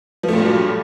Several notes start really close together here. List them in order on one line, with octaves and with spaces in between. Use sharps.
F3 A3 A#2 G2 F#3